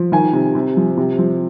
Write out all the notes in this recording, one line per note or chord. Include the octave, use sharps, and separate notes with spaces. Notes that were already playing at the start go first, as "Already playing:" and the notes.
Already playing: F3
D#3 G#5
C3
C3
F3
C3
F3